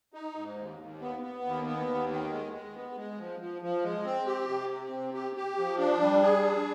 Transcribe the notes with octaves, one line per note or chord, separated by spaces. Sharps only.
D#4
G#2
D#2
D#2
B3
B3
D#2
B3
D#2
D#3
G#3
G#3
B3
G#3
F3
F3
F3
G#3
C4
G4
C3
C4
C3
G4
G4
F3
D4
G3
G#4
D4